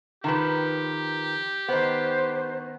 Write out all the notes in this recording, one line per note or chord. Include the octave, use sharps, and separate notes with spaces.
D#3 F3 G4 B4
D#3 B3 C5